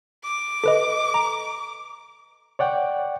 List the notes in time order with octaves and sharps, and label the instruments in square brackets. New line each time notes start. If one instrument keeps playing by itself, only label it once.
[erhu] D6
[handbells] A4 B4 D#5
A#5
[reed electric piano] C#5 D5 F#5 G5